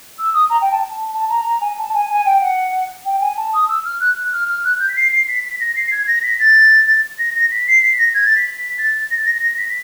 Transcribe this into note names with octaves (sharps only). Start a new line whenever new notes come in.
E6
D#6
A#5
G5
A5
A5
A5
A#5
A#5
G#5
A5
G#5
G#5
G5
F#5
G5
G#5
A5
D#6
E6
F6
F#6
F6
F6
F#6
G6
B6
C7
C7
B6
B6
A#6
C7
G#6
A#6
B6
A6
A#6
A#6
B6
C7
B6
A#6
G#6
A6
B6
B6
A6
A#6
A6
A#6
A#6
B6